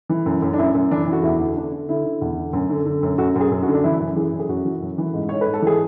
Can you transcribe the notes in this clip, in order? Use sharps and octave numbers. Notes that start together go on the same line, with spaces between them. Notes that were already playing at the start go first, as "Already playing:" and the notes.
E3
F#2
F#2
D4
F#2 E4
F#2
E3 D4
E3
F#4
E2 E4
D3
D3 D4
D3
D3 E4
D3
E2
D3
F#2
D3
D3
F#2
F#2 F#4
F#2
G#4
F#2
F#4
D3
D4
E3 E4
F#2
E3 G#4
F#2
G#4
F#2 F#4
E3
F#2
E3
G#2
G#2 C#5
B4
G#2
A4
E3 G#4